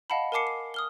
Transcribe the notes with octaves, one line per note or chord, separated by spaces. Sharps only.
D#5 F5 F#5 A5 B5
A#4 G#5 A5 D6 C7 C#7
C7
D#6 F6 G7